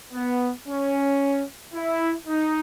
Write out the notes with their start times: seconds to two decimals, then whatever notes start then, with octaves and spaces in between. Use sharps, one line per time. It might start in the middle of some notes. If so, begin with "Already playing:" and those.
0.13 B3
0.67 C#4
1.74 E4
2.27 D#4